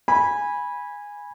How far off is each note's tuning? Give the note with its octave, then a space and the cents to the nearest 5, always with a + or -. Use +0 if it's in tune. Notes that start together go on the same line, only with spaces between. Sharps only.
G#5 -10 B5 -15